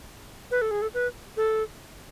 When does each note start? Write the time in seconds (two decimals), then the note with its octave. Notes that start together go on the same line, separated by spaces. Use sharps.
0.51 B4
0.61 A4
0.71 G#4
0.82 A4
0.94 B4
1.37 A4